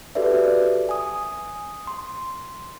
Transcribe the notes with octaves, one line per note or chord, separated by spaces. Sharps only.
F#4 G4 A4 B4 D5 E5
G#5 D#6
C6